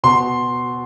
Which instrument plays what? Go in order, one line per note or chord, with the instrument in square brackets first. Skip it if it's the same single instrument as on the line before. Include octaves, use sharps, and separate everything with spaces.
[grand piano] B2 C6